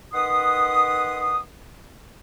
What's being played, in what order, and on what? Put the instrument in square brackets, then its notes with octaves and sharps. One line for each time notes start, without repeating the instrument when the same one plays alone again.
[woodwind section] D#3 B4 F#5 C6 D#6